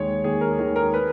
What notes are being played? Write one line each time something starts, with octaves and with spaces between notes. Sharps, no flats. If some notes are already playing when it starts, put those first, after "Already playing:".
Already playing: D#2 D#3 G#3 C#5
D#2 G#4
A#4
D#3 G#3 G#4
A#4
B4